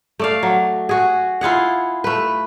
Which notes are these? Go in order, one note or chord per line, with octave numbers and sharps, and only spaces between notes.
A3 D5 F5
F#3
F#4 G#4
E4 F4 G#4 F#5
A3 B4